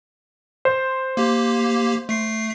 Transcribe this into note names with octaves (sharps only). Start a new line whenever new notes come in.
C5
A#3 G4
A3 C7